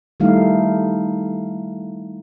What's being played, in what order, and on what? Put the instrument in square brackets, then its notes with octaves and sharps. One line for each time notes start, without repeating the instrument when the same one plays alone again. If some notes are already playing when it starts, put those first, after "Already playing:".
[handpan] D#3 G3 A3 D#4 E4 F5